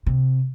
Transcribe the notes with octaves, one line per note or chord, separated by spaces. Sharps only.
C3